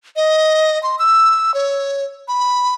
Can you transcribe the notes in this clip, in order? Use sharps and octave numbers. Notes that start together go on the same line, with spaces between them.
D#5
C6
E6
C#5
B5